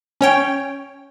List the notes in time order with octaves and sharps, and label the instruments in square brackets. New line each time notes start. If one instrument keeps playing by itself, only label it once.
[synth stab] C#4 C#5 G5